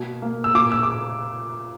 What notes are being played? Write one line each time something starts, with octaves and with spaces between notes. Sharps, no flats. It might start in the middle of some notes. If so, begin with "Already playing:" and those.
Already playing: B2 A#3
A#3
E6
A#2 D6
E6
D6